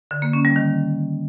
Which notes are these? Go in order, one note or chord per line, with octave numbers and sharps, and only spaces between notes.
D3
A#3
C#4
G3
D#3